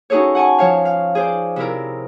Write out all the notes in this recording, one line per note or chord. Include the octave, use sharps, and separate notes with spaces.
C#4 D#4 F#4 G#4 A4 C#5
F#5 G#5 A5 C#6
F3 C#5 F5
F5
G#4 C5 D5
C3 E4 A#4